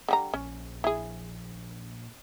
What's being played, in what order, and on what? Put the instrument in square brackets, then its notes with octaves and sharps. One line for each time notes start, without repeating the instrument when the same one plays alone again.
[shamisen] D3 G3 A#5
[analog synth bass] A#1 [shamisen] C#4
[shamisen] E4 G#4